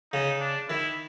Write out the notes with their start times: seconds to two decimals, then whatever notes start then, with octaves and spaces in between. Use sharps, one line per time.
0.12 C#3 D#4
0.40 D4
0.69 D#3 E4